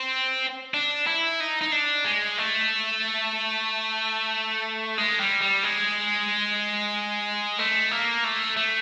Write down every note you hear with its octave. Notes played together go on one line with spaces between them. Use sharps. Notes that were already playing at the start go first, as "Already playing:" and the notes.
Already playing: C4
D4
E4
D#4
D#4
D4
G#3
A3
G#3
G3
G3
G#3
A3
A#3
A3
A3